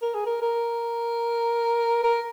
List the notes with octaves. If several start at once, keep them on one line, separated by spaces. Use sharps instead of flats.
A#4
G#4
A#4
A#4
A#4